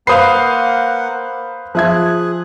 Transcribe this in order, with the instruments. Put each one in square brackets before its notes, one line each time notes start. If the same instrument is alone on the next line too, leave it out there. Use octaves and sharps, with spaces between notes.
[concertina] A#3 F#5 [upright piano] B4 C5 [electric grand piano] F5 D#6 C7
[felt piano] F3 E5 G#6 [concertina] G#4 F#6